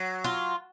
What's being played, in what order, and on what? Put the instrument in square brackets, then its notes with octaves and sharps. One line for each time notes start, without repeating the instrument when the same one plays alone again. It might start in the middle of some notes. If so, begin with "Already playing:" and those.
Already playing: [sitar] F#3
[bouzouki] F4